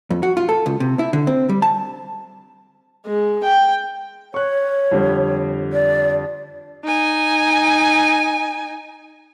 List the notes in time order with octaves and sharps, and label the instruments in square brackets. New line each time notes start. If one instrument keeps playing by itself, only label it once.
[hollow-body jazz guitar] F2
F#4
F4
A4
C#2
C3
E4
D3
C4
G3
A5
[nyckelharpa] G#3
G5
[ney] C#5 [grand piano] C#6 F#6
[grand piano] F2 D3 G3
[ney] D5
[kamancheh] D#4 G#5